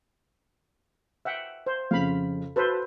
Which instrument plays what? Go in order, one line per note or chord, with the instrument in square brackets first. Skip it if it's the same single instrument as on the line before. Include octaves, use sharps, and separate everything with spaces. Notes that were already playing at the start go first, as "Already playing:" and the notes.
[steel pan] E5 F#5 G5
C5
[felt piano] F2 C#3 [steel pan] F5 B5
[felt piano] F#4 [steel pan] A4 B4 C5